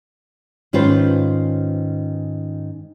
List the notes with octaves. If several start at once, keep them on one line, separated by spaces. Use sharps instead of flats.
G#2 D#3 C#4 F4 B4 C5